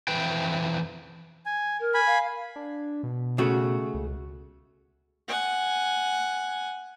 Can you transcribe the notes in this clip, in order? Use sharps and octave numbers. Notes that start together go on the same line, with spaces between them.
F2 E3 B4 G5
G#5
A#4
G#5 B5
F5
D4
B2
C#3 A3 F#4
C#2
F#5 G#5